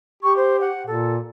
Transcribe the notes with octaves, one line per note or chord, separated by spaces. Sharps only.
G4 C#6
C5
F#5
A#2 A4